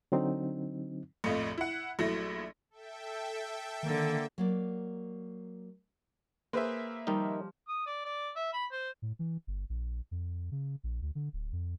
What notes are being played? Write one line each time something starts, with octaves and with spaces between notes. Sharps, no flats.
D3 F#3 C4 D#4
A#1 F2 A2 A3 F4 D#5
E4 F#5
A#1 F#3 A3 E4 A#6
A4 E5 G5
D3 D#3 A#3
F#3 A#3 D5
A#3 G#4 B4 C5 E5
D#3 F3 G3 D#4
D#6
D5
D5
E5
B5
C5
A2
E3
G1
A#1
F2
C#3
A#1
D2
D3
D1
F2